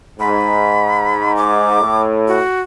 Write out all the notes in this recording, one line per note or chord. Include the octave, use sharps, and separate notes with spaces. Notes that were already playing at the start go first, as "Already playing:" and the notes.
G#2 B5
D6
A2
F#4